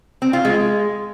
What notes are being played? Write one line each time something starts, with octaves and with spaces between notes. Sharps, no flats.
C4
F4
G#3